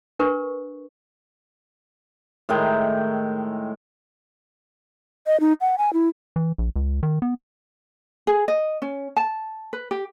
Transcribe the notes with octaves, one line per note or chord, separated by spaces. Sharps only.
D4 A#4 B4 C#6
A2 D#3 G#3 G5
D#5
D#4
F#5
G#5
E4
E3
A#1
C#2
D#3
B3
G#4
D#5
C#4
A5
B4
G4